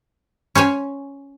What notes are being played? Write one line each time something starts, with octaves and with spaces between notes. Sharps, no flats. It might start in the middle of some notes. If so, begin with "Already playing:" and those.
C#4 C5 C#5 G#5